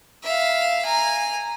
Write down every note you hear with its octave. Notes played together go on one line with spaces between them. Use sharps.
E5 F5
G#5 A#5